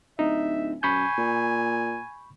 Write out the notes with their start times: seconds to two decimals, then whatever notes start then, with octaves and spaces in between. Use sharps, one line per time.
0.19 D1 D#4 E5
0.83 F#2 G#5 B5 C#6 G6
1.18 A#2